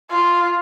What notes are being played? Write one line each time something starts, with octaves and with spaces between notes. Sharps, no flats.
F4